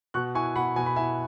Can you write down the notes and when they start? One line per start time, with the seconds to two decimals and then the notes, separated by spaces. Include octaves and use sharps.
0.14 B2 C#6 F#6
0.35 E4 G#5 C#6
0.56 B2 F#5 B5
0.76 B2 G#5
0.86 B5
0.96 E4 E5 G#5